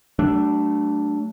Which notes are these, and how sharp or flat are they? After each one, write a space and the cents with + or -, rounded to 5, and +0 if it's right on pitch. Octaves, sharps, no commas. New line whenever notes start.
F#3 +45 A3 +0 D4 +0